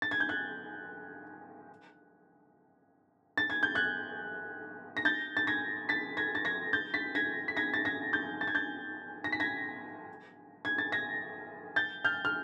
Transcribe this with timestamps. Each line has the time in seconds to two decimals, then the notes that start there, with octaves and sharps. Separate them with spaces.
0.02 A6
0.11 G#6
0.20 G6
0.29 F#6 G#6
3.38 A6
3.50 G#6
3.63 G6
3.75 F#6 G#6
4.97 A#6
5.05 G6 A6
5.37 A6
5.47 G#6 A#6
5.89 A6 B6
6.17 G#6 A#6
6.35 A6
6.45 G#6 A#6
6.73 G6 A6
6.94 A6 B6
7.15 G#6 A#6
7.48 B6
7.57 G#6 A#6
7.74 A6
7.85 G#6 A#6
8.13 G6 A6
8.41 A6
8.47 G#6
8.55 G6 A6
9.24 A#6
9.32 B6
9.40 G#6 A#6
10.65 G#6
10.78 A6
10.92 G#6 A#6
11.76 G6 A6
12.05 F6 G6
12.25 F6